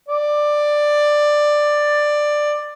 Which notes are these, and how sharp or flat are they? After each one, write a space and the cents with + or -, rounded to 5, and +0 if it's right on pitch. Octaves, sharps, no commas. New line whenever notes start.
D5 +10